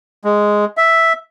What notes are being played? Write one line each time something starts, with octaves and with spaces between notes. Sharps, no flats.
G#3
E5